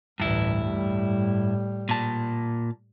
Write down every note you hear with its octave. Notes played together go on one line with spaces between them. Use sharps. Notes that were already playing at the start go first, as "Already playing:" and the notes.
A1 D2 G2 E4
A2 G3
A#2 A5